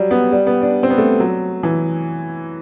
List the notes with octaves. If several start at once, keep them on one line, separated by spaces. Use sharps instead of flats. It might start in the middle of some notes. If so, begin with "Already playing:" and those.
Already playing: F#3 G3
B3
G3
B3
D4
C4
B3
A3
F#3
E3